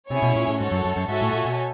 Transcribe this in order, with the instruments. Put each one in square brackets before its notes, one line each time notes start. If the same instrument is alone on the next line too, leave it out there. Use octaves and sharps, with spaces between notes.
[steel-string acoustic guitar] C3 [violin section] C#4 E4 G#4 C#5
[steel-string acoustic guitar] B2
A#2
A2
[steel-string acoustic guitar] G#2 [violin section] F#4 A4 C#5
[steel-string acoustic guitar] F#2
F#2
F#2
[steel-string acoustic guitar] G#2 [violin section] F#4 A4 C#5 E5 G#5
[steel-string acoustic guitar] A2
A#2
B2